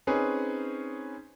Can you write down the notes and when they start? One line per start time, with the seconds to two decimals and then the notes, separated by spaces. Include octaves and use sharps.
0.07 C4 C#4 D#4 G#4 B4